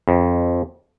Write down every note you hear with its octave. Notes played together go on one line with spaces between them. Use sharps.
F2